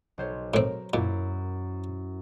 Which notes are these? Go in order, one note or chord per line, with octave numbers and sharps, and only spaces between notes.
B1 C5 C#5
A2 C4 A#4
F#2 A#2 E4